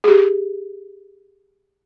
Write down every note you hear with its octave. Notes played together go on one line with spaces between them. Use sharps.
G4 G#4